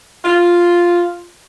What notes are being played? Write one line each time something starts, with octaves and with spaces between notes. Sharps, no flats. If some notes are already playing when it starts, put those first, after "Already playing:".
F4